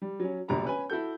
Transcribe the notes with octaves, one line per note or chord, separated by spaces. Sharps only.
G3
F#3 C#4
E1 A#1 D3 G3 A#5 B5
C#4 B4 G#5
E4 F#4 A4 G6